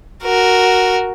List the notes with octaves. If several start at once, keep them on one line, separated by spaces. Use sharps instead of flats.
F#4 A#4